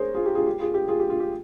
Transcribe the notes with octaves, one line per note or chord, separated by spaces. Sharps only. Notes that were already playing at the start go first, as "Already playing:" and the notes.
Already playing: G#4 A#4 C5 C#5
F4 G#4
G4
F4 G#4
G4
F4 G#4
G4
F4 G#4
G4
F4
G4